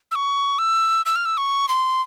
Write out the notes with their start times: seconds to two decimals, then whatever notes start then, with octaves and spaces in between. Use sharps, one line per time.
0.11 E6
0.15 C#6
0.59 E6
1.06 E6
1.16 F6
1.25 E6
1.37 C#6
1.69 C6